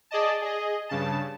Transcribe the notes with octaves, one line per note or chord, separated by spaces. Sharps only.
G#4 D5 D#5 A5
G#4 D#5
G2 C#3 A5